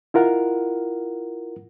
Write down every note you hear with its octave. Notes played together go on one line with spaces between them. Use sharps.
E4 F4 A#4 F#5